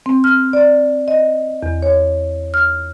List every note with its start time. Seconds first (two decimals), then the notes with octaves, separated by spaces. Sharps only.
0.06 C4
0.24 F6
0.53 D5
1.08 D#5
1.63 E2
1.82 C#5
2.54 F6